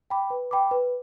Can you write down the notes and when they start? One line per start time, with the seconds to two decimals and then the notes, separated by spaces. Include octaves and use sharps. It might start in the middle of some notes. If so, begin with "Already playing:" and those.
0.10 G5 B5 D6
0.30 B4
0.51 G5 B5 D6
0.71 B4